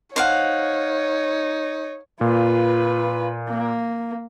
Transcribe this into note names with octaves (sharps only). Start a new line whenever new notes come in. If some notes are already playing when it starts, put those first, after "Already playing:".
D#4 C5 C#5 F5 F#5
A#2 F4 B4
A#3